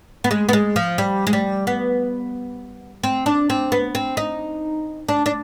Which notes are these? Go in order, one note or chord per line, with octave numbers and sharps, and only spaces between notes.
B3
G#3
B3
G#3
F3
G3
G#3
G3
B3
C4
D4
C4
B3
C4
D#4
D4
D4